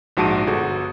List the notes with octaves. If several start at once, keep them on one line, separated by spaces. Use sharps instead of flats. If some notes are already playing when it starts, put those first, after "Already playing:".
A#1 G#2 F#4 A5 D7 D#7
G1 F#4 G#4 A4